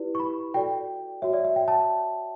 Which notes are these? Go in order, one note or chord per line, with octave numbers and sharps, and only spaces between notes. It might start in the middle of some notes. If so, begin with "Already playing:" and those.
Already playing: E4 G4 B4 D5
C#6
B5
F#4 A4 D5 G5
F#4 C#5 E5
D5
E5
G5
A5